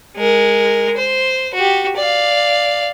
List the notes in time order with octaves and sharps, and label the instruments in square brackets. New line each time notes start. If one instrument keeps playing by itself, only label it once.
[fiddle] G#3 A#4
C5
F#4 G4
D5 F5